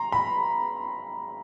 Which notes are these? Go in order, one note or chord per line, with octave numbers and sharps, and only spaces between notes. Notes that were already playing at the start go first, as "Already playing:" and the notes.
Already playing: A#5 C6
B5